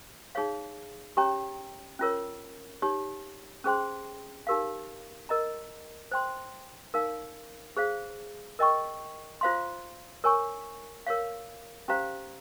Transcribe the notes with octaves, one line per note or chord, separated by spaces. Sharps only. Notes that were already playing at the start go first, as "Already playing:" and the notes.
D#4 G#4 C#5 F5
C#4 G4 C#5 G5 A#5
C#4 F4 A#4 C#5
D#4 G4 C#5
C#4 G#4 C5 G5 C6
D#4 G4 A#4 F5
A#4 D#5 A#5
C5 G5 C6
D#4 A#4 F5
G#4 C5 F5
A#4 D#5 G5 C#6
F4 C5 F5 C6
A#4 C#5 G#5 C#6
A#4 C#5 F5
C#4 G4 C5 F5 A#5